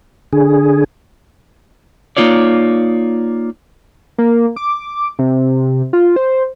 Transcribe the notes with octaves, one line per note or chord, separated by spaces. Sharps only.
D3 G#4
A#3 D#4 F4 C#5 D5
A#3
D6
C3
F4
C5